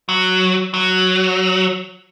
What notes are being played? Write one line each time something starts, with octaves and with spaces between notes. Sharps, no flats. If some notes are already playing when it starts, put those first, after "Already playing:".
F#3
F#3